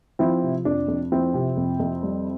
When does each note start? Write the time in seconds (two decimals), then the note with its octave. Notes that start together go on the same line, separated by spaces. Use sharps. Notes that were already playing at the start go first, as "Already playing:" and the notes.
0.19 F3 C4 E4
0.43 C3
0.65 F2 D4
0.88 F2
1.12 F3 C4 E4
1.34 C3
1.57 F2
1.79 F2
2.03 G3